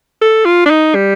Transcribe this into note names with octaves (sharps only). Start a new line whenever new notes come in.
A4
F4
D4
D#4
G3